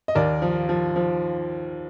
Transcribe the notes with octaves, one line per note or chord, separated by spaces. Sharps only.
D#5
D#2 A#4 D5
F3
F3
F3